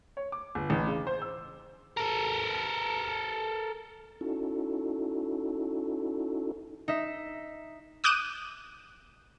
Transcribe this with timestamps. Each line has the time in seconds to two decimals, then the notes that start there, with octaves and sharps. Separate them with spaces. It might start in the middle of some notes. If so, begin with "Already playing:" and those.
0.17 C#5
0.32 D6
0.55 G1
0.70 A1
0.87 C#3
1.07 C5
1.22 E6
1.97 A4 A#4
4.21 C#4 D#4 E4 F#4 A4
6.88 D#4 E5
8.04 D6 D#6 F#6 G6 D#7 E7